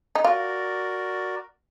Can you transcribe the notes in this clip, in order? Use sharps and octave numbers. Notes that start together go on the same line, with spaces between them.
D#4
F4 F#4 A#4 D5